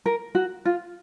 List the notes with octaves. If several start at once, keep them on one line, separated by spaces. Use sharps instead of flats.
A#4
F#4
F4